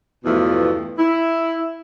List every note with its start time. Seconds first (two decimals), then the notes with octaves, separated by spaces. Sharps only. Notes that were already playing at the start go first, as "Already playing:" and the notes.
0.24 E2 G2 B2 F3 A3
0.98 E4